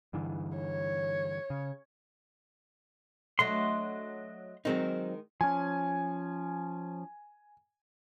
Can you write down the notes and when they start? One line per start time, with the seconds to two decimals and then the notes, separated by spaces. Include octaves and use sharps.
0.13 G2 D3 E3
0.57 C#5
1.50 C#3
3.39 F#3 A3 D4 D#5 C6
4.65 D#3 F#3 G#3 C4 D#4
5.41 F3 C#4 G#5